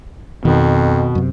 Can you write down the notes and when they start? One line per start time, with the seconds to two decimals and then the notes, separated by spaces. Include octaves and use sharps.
0.45 F2 B2 D#3
1.15 F#2 C3